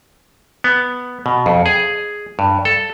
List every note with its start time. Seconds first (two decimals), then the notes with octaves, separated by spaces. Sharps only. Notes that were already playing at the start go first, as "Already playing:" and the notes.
0.64 B3
1.26 B2
1.46 F2
1.66 G#4
2.39 G2
2.65 A4